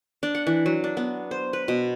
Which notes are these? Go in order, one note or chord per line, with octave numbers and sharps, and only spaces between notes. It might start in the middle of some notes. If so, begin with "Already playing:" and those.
D4
F#5
E3
F#3
D4
B3
C5
B4
B2